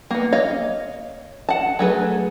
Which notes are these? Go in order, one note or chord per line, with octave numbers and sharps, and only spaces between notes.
A#3 B3
C#5 D#5 F5
F#5 A5
F#3 A3 G#4 B4